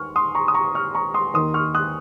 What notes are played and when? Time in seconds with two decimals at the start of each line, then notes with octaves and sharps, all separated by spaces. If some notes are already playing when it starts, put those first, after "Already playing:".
Already playing: D#2 C#6 F6
0.16 C6 D#6
0.35 A#5 C#6
0.48 D#6
0.54 A#5 C#6
0.75 C#6 F6
0.95 A#5 C#6
1.14 C6 D#6
1.34 D#2 D#3 A#3 C6 D#6
1.54 C#6 F6
1.75 D#6 F#6